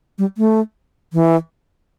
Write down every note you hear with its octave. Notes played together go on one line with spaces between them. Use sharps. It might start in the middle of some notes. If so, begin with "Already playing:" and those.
G3
A3
E3